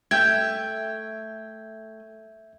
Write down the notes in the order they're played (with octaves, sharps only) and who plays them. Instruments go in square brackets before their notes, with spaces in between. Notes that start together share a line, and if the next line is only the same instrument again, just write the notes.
[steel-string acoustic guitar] A3 G5 [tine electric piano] E5 G6 G#6